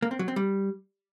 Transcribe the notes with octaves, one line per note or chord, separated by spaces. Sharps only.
A#3
C4
F#3
C4
G3